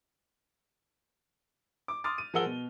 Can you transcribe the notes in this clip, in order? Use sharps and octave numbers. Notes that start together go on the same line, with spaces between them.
D6
C6 D6 D#6 F6 A6
D#7
F3 G#4 A#4 F#5 E6 G7
B2